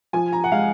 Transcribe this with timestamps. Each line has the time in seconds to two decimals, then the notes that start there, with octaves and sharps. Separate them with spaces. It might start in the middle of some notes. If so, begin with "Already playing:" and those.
0.13 F3 G#5
0.32 A#5
0.44 F#5
0.52 G#3 F5